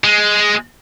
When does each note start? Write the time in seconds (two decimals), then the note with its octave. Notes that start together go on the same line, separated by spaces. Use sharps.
0.04 G#3